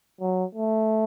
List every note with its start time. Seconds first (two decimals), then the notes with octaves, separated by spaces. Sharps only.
0.21 F#3
0.55 A3